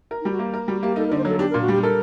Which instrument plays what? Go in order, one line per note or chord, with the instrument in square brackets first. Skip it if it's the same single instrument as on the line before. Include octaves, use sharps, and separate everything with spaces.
[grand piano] A#4
[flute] D#4
[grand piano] G3
[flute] F#4
[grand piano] A#3
A#4
[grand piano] G3 [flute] F#4
[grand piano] A#3 [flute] G4
[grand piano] D#4 [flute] A4
[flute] A#4
[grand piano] D3 [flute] D5
[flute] C5
[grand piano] F#3 [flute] A4 A#4
[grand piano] D4 [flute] G4
[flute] A#4
[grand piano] A#2
[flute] F#4
[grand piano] G3 [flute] G4
[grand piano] A4 [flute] A#4